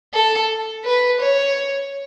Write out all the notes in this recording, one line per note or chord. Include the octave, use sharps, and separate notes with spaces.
A4
B4
C#5